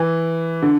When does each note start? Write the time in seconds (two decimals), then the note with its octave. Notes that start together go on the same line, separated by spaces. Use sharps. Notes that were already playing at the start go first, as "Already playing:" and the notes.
Already playing: E3
0.62 D3